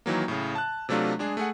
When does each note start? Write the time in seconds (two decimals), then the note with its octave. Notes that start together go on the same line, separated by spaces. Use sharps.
0.06 D#3 E3 F#3 A#3
0.28 A2 C#3
0.55 A5 F#6
0.89 C3 F#3 A3 D4 F4
1.19 G#3 D4 G#4
1.37 A3 G#4 F#5